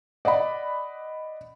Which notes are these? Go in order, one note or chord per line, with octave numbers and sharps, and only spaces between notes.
D5 D#5 F#5 B5